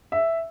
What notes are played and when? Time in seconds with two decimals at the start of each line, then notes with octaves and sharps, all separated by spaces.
0.12 E5